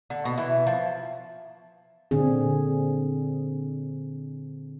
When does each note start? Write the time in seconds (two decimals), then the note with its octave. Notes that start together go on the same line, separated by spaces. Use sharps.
0.10 D3
0.25 B2
0.38 E3
0.67 F3
2.11 A#2 D3 C4 D4 G#4